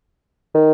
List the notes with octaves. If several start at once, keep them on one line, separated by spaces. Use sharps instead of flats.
D#3